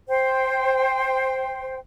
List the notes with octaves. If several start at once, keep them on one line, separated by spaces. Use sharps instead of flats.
C5 G5